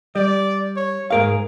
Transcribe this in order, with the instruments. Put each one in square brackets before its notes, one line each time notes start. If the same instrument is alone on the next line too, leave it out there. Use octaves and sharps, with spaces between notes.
[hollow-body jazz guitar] G3 [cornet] D5
[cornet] C#5
[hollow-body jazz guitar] G#2 A#4 F5 [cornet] G#4